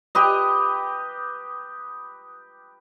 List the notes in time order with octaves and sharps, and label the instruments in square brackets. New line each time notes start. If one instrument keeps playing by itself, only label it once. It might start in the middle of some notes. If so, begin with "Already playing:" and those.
[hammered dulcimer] G4 B4 D#5